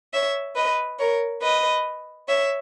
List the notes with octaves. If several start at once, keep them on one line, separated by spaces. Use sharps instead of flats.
C#5 E5
B4 D#5
A#4 C#5
B4 D#5
C#5 E5